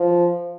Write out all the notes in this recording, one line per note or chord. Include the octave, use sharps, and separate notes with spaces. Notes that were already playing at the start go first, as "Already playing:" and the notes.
Already playing: F3